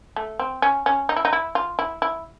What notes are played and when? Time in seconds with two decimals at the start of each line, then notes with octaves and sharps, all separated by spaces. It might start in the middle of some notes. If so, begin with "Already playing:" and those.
0.16 A3
0.39 C4
0.62 C#4
0.86 C#4
1.09 D#4
1.16 E4
1.25 D#4
1.33 E4
1.55 F4
1.79 E4
2.02 E4